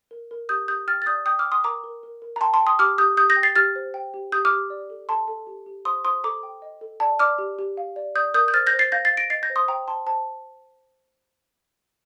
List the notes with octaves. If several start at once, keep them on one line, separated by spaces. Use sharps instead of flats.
A#4
A#4
G4 D#6 G6
G4 D#6 G6
G5 F6 A6
A6
D5 D#6 G6
G5 D#6 G6
D6 F6
G5
C6 D#6
A#4 A#5 D6
A#4
A#4
A#4
A#5
G5 A5 C6
A5 C6
G5
C6 D#6
G4 D6 F6
G4 D#6 G6
G4 D#6 G6
G6 A#6
G5
A6 C7
G4 F6 A6
C5
G5
G4
G4 D#6 G6
D6 F6
G4
D5
A4
A4 A5 C6
A4
G4
G4
C5 C6 D#6
C5 C6 D#6
A4 A#5 D6
G5
D#5
A4
D5 A5
D5 D6 F6
G4
G4
F5
D5
D5 D#6 G6
A#4 D#6 G6
G6
C5 F6 A6
G6 A#6
C5
A6 C7
F5 G6 A#6
A6 C7
F5
A#6 D7
D#5 A6 C7
G6 A#6
C5
C6 D#6
C5 G5 A#5
C5 A5 C6
C5 A5